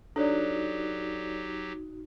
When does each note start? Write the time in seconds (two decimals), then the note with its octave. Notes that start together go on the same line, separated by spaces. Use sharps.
0.16 F#3 D4 D#4 F#4 G4 A4 C#5 D5